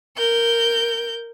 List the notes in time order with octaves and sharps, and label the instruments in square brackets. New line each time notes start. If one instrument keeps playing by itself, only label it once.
[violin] A#4 G6